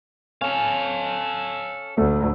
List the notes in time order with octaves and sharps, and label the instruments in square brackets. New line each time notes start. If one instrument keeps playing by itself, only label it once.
[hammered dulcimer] C#4 [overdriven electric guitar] A4 F5
[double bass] D2 [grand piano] A3